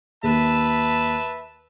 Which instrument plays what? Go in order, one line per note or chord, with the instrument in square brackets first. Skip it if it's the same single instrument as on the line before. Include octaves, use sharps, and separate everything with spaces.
[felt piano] D#2 [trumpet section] B4 E5 A5